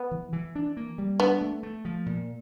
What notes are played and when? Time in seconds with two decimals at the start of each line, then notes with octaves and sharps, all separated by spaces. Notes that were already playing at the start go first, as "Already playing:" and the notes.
Already playing: B3
0.11 E3
0.33 E3
0.55 D4
0.77 A#3
0.98 G3
1.20 B3 D4
1.41 A3
1.63 A3
1.85 F3
2.06 A#2